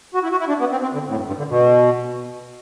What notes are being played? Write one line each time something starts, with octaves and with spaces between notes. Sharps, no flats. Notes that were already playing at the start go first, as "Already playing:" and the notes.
F#4
E4
F#4
E4
D4
B3
C4
C4
D3
A2
G2
G2
D3
B2